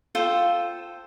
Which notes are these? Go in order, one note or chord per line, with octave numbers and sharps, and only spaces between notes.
F4 A4 C5 G5